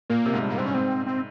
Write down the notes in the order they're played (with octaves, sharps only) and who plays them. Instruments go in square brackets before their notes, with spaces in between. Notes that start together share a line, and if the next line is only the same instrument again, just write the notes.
[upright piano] A#2 [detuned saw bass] A#3
[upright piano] C3
G#2
G2
[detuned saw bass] A#3
[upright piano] G2 [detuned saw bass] C4
[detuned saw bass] C#4
[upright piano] G#2 [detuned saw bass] C4
[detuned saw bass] C4